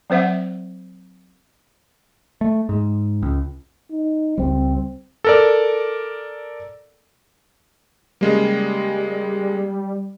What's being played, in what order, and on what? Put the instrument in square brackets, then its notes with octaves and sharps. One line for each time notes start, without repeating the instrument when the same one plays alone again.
[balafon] F#3 C4 C5 E5 F#5
[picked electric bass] A3
G#2
C#2
[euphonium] D#4
[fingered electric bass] C#2 G3 [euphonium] C4
[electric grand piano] A4 A#4 D5
[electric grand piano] C#3 G#3 A#3 [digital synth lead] G3